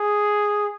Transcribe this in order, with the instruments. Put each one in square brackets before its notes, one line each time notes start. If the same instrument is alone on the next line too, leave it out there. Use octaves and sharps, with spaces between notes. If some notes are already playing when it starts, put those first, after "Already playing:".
Already playing: [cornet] G#4